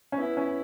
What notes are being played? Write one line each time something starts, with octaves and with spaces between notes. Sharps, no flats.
C#4
B3 E4
C#4